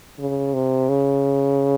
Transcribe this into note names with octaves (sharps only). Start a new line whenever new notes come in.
C#3
C3
C#3